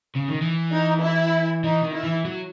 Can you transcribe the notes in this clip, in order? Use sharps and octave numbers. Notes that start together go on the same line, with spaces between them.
C#3
D#3
E3
D#4
E4
E3 D#4
D#3
E4
E3
F#3